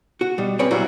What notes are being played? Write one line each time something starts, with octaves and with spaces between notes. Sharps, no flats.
F#4
B2 G3
C4 C#4 G#4 B4 C#5 D5
A#2 F#3 G3 A#3 E4 F#4